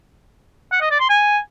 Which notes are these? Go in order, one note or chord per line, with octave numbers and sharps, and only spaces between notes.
F#5
D#5
D5
C6
G#5